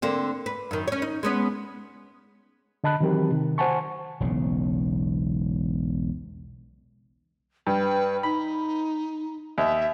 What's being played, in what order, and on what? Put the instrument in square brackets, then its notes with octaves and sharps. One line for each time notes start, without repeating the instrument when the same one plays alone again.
[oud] D3 A#3 C4
B4
F#2 D#3
C#4 C#5
D#4
G#3 B3 C#4
[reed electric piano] D3 D#5 A5 B5 F#6
D#3 E3 F#3 C4 G4 A#4
C3 D#3
C5 F#5 G#5 A5 C#6
[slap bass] E1 B1 C#3
[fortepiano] G2 [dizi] B4
[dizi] D#4 [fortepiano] B5
[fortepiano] D#2 [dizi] E5